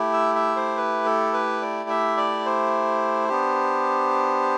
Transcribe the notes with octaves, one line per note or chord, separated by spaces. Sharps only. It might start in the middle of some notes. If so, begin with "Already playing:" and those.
Already playing: A3 E4 G4
E5
E5
C5
B4
A4
B4
D5
E5
D5
C5
B3 D4 G4